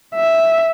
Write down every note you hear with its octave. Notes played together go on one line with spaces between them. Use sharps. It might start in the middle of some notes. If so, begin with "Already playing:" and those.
E5